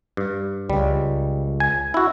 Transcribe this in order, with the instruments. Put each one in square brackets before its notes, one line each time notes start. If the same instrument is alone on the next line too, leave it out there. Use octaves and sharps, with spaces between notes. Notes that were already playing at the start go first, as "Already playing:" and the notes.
[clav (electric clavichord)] G2
[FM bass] C#2 [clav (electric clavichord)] G3
[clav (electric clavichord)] G#5
E4 F#4